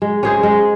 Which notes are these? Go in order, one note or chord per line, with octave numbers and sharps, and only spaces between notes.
G#3
C#4 G#4 C5
G#3